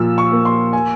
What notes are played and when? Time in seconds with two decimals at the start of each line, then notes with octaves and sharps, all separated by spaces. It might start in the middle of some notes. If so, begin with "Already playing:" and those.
Already playing: A#2 F3 A#3 E6
0.18 C#6
0.32 A#3
0.45 C6
0.73 G#5